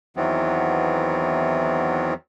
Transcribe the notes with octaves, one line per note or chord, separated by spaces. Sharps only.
E2 D#3 E3 F#3 B3 C4